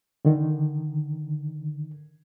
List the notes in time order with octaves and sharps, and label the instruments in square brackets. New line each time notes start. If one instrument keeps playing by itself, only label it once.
[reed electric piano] D3 D#3